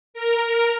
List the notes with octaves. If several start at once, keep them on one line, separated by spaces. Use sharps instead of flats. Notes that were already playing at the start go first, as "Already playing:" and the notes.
A#4